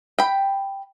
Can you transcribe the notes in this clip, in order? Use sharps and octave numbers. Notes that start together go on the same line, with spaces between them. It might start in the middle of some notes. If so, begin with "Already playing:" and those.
G5 B5